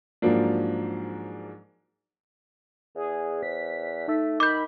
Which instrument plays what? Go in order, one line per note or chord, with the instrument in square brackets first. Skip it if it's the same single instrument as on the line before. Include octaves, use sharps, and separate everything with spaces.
[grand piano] G#2 F3 F#3 A#3 D4
[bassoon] E2 [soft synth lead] G#4
[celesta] C5 [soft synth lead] B6
[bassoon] A3 [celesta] D#4 E6
[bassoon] D#3 [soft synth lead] B5 [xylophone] D6 G6